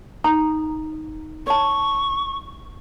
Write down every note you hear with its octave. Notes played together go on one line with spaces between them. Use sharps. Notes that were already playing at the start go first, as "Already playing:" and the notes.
D#4 A#5
C#5 A5 C#6